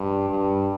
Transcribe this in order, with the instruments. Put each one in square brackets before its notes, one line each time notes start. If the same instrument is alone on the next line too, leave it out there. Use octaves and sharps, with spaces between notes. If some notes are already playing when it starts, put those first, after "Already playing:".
Already playing: [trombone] G2
G2